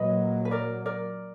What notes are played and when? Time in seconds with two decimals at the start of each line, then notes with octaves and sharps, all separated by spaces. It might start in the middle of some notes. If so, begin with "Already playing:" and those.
Already playing: A#1 A#2 F#3 A#3 B4 D#5
0.45 B4
0.51 A#4 D5
0.86 A#4 D5